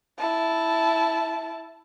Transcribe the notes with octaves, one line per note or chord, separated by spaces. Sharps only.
E4 A5